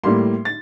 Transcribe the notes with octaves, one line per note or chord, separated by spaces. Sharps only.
A2 G3 A#3 C6
A6